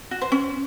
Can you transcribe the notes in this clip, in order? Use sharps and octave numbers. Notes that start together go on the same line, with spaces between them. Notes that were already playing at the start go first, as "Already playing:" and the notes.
F#4
C5
C#4